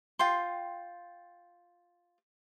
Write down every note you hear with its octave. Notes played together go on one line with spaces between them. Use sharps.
F4 G5 C6